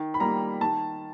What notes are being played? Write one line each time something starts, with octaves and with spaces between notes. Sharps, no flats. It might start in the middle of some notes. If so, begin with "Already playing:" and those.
Already playing: D#3
B5
G3 A#3 A#5
D#3 A5